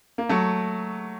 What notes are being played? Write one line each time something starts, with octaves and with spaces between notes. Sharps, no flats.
A#3
F#3 A3